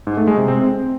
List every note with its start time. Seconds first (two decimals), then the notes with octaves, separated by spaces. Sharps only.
0.07 G#2
0.17 A3
0.27 G#3
0.38 C3
0.48 C4